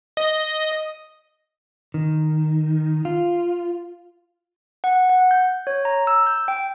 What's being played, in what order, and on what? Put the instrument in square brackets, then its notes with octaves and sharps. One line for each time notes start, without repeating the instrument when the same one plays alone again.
[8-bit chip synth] D#5
[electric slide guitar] D#3
F4
[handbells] F#5
F#5
G6
C#5
A#5
E6
G6
G5